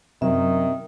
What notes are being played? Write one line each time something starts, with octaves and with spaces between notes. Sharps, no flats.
F#2 C3 D#3 F#3 E5